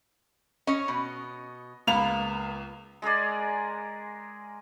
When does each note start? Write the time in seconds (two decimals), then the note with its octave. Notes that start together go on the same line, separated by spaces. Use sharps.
0.67 C#4 C#5 D#5
0.88 B2
1.87 C#2 A#3 B3 F5 F7
3.02 G#3 G#4 A#4 D5